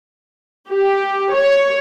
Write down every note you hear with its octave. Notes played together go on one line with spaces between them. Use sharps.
G4
C#5